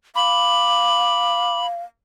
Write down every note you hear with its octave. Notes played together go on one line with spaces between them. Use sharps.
F5 B5 D6